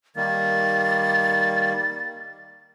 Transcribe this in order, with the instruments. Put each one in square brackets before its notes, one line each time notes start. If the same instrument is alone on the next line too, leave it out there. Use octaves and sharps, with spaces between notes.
[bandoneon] D#3 G3 A#3 [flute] A6